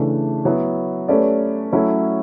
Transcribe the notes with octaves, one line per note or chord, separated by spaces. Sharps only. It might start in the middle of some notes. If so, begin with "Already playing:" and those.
Already playing: C#3 E3 A3 D4
F#3 B3 E4
A3 C#4 G4 B4 D5
F#3 A3 C#4 E4